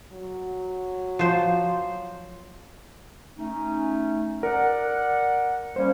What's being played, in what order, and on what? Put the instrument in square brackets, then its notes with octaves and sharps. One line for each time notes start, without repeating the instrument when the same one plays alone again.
[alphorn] F#3
[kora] F3 C5
[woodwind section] A3 C#4 D#4
[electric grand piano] A#4 [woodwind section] D5 F#5
[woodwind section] G3 A#3 C#4 [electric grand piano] C5